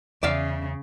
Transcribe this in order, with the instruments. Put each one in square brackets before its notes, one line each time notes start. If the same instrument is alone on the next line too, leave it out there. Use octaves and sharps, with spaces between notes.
[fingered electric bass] E2 [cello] C#3 [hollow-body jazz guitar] D5 E5 F5